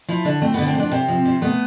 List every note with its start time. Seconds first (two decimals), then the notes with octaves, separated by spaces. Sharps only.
0.08 F3 E4
0.25 D3 D4
0.41 A3 C4
0.54 D3 B3
0.67 C4
0.75 F3 D4
0.91 C3 C4
1.08 F3
1.25 C3
1.42 A3 B3